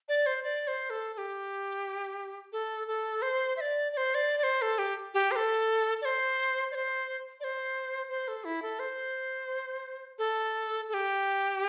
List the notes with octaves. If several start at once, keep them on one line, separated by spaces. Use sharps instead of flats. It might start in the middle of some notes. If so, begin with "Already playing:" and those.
D5
C5
D5
C5
A4
A4
G4
A4
A4
C5
E5
D5
D5
C5
D5
D5
C5
A4
G4
G4
C5
A4
D5
C5
D5
C5
D5
C5
C5
A4
E4
A4
C5
A4
A4
G4